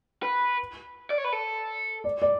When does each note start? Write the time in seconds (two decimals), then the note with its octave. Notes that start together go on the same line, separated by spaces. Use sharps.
0.23 B4
1.10 D5
1.18 C#5
1.24 B4
1.33 A4
2.04 D5
2.22 D5